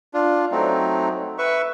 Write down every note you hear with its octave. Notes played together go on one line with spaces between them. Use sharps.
D4 F4
F#3 A3 C4 D#4
B4 E5 C#6